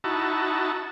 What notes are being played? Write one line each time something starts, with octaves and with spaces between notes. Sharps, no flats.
D#4 E4 F#4 A5